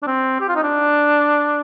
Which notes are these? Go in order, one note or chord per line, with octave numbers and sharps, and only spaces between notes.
D4
C4
G4
F4
D#4
D4